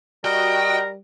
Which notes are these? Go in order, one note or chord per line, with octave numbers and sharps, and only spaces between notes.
G3 F#4 A#4 D#5 G5